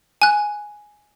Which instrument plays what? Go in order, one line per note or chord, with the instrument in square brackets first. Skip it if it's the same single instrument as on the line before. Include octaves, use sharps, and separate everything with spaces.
[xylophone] G#5 F#6